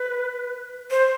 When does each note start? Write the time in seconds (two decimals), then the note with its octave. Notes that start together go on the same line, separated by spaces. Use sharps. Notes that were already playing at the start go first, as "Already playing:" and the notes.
Already playing: B4
0.91 C5